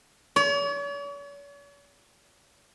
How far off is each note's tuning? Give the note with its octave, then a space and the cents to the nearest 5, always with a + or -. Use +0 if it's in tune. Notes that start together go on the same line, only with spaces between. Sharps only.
C#5 +45